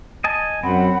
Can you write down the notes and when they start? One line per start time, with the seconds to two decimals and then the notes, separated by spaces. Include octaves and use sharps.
0.24 D#5 G#5 A5
0.63 F#2 C4 F#5 B5